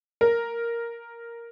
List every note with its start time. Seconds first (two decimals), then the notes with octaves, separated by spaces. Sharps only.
0.21 A#4